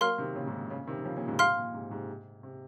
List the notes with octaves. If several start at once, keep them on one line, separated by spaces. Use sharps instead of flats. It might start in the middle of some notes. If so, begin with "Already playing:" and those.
F#3 A#3 A#4 F5 C6 F6
C3 D#3
A#2 C#3
G#2 C3
A#2
A#2 C#3
C3 D#3
D#3
C#3 F3
A#2 C#3
G#2 C3
A#2 F5 C6 F6
A#2
G#2 C3
G#2 C3
C3